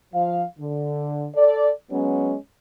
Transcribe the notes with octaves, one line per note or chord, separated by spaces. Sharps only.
F3 F5
D3
A4 D5
F#3 G#3 B3 C#4